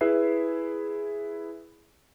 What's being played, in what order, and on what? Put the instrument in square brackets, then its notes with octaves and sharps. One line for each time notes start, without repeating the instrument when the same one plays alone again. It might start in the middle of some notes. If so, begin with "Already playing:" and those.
[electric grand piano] E4 G#4 B4 E5 C7